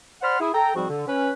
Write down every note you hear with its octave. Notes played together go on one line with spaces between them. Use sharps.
C5 D5 F#5 B5 C6 F6
E4 G#4
A4 G5 A#5
G#2 F3 G3 C4 F#4
D3
C#4 B4